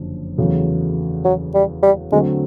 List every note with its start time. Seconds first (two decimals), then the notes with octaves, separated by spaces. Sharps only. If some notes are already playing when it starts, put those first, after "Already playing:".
Already playing: F#1 F2 D3
0.38 E2 C#3 F#3 A3
1.25 F#3
1.55 G3
1.83 G3
2.12 D3 F#3 G#3 A3 C4